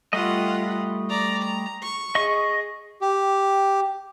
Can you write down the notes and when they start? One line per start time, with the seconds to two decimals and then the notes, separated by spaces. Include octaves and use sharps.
0.13 G3 A3 F4 D#5 F#5
1.10 D5 A#5
1.43 A#5
1.83 C#6
2.15 G#4 D#5 C#6
3.01 G4